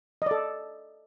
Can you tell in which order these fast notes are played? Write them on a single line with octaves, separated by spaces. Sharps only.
D#5 D5 A4